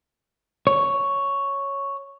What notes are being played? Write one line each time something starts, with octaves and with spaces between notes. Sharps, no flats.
C#5